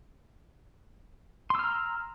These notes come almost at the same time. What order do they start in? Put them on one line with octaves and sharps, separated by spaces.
C6 E6 F6 A#5